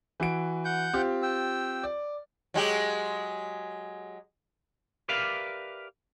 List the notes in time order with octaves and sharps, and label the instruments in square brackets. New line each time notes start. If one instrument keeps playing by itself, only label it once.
[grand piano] E3 F#4 D7
[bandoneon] F#5 G6
[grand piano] C4 F4 G4
[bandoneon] G5 E6
[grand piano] D5
[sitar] F#3 G#3 G4
[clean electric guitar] G4 A#4 B4 D5 E5 F5